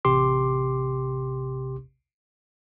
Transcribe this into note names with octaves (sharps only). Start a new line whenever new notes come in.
A1 C3 G4 C6 D6